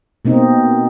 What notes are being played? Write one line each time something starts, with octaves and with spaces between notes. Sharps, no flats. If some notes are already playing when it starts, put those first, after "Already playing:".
B2 A#3 C4 D#4